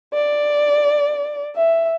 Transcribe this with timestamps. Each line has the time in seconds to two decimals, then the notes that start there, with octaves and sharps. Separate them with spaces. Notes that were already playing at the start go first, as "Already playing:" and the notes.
0.14 D5
1.56 E5